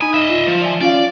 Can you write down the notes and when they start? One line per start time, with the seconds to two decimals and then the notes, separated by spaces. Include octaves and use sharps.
0.01 D#4 G#5 B5 D#6
0.14 D#5 E5
0.30 F4
0.48 F3
0.61 D5 E5 G#5
0.81 C#4 F4 D5 F5